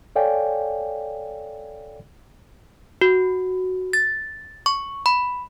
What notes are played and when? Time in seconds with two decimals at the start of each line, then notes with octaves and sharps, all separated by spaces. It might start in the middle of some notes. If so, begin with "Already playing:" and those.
0.16 A4 C#5 D5 F5 G5 G#5
3.01 F#4
3.93 A6
4.66 C#6
5.06 B5